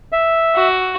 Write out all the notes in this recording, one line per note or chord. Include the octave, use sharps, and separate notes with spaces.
E5
F#4